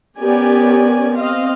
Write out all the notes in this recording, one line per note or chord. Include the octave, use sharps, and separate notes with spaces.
B3 C#4 G4 A#4 D5 G#5
C4 D#5 F5